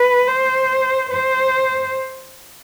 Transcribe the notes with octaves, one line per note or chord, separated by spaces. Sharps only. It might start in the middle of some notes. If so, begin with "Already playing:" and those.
Already playing: B4
C5
C5